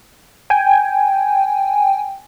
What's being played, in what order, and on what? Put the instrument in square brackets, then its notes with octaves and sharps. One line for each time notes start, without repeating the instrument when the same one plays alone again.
[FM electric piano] G5 G#5